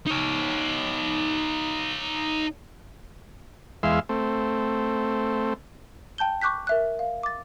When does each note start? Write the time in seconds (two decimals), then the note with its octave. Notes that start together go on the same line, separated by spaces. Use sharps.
0.07 D#4 C#5
3.83 E2 G#3 E5 F5 C6
4.09 A3 C4
6.18 G5 A5 G6 G7
6.42 C#6 D6 F#6 G6 B6
6.67 A#4 E5 F#6
6.99 F5
7.23 D6 A6